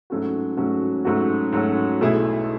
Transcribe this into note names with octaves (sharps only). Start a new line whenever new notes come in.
G#2 F#3 A3 C#4 F#4
G#2 F#3 A3 C#4 F#4
G#2 F#3 A3 C#4 F#4
G#2 F#3 A3 C#4 F#4
B1 B2 A3 E4 G#4